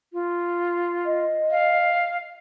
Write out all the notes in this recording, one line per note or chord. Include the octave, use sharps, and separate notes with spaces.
F4
D#5
F5